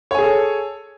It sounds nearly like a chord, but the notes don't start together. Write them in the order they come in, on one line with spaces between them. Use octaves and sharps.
C#5 G#5 G#4 A4